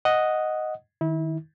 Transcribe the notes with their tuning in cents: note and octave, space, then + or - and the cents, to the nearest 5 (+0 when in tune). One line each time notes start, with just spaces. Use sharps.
D#5 +0 F#5 +0
D#3 +0 E4 -30